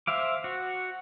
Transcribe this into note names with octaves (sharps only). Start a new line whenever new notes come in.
C5 E5 F5 D6
F#4